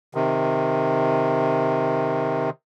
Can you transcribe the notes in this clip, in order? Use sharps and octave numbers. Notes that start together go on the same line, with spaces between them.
C3 D#3